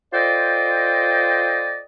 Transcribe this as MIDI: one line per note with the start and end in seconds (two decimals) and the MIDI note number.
0.13 1.82 65
0.13 1.82 69
0.13 1.82 72
0.13 1.82 74
0.13 1.82 75
0.13 1.82 79